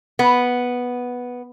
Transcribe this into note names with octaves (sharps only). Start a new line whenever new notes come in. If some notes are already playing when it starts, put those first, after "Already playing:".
B3